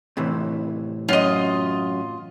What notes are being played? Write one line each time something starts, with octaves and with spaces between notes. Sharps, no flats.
A2 C3 E3
F#2 F4 D#5